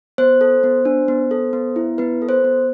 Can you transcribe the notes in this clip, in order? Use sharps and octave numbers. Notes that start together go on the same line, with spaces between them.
B3 C5
A4
B3
D4
B3
A4
B3
E4
B3 B4
A4
C5
B3